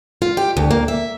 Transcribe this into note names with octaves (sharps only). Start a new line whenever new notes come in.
F4
G4
D2
A#3
E5